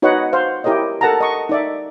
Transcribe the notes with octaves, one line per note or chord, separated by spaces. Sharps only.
D#4 F#4 B4 C#5 D#5 F#5
C5 F5
E4 G4 A#4 C#5 D#5
A4 A#4 F#5 A5 A#5
D#5 C#6
D#4 D5 E5